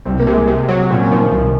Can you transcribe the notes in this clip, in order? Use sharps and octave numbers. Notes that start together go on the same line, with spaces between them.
C2 C4
A#3
C3
G#3
C3
F#3
A#2 C4
C#4
D#3 F3
D#3
C2